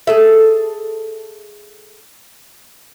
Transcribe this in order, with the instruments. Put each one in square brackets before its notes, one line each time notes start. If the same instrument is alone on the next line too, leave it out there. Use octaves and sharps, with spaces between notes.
[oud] G#4 A4 E5